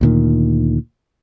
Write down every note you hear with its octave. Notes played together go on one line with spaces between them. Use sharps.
D2 A#2 D#3